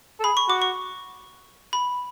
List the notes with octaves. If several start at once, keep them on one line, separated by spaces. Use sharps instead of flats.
A4
G#4 B5
C#6
F#4 D6
C#6
B5